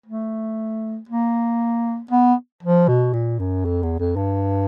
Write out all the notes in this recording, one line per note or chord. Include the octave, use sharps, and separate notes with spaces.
A3
A#3
B3
F3
B2
A#2
F#2
F2
E2
F2
G2